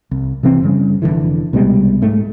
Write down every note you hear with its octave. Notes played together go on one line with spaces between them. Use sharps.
C2
C3 E3 C4
F#2 C#3 G3
F1 D2 D3 E3
C2 B2 G3 G#3
G#2 A3